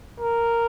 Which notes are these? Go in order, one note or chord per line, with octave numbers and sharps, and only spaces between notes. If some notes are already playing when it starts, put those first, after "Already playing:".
A#4